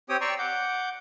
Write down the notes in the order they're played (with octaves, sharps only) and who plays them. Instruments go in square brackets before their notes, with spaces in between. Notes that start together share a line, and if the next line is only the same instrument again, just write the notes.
[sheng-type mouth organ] C4 G4 C#5 G5 D#6
D5 G5 A#5 C6 C#6 E6
F#5 D6 G6